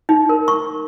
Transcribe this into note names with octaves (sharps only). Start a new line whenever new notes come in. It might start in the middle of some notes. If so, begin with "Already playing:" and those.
D#4
A#4
C#6